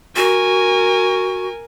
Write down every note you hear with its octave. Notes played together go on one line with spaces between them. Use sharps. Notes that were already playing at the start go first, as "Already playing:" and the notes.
F#4 A#4 G#5